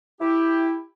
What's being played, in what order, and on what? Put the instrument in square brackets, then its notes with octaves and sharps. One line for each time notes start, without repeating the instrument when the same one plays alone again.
[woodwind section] E4 G4